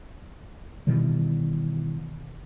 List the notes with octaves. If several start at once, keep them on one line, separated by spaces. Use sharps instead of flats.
B2 D#3 E3 G3